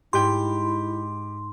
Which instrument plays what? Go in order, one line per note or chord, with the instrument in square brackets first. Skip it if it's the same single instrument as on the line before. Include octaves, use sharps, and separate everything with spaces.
[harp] G#2 [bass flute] E4 [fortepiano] G4 G5 [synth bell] C6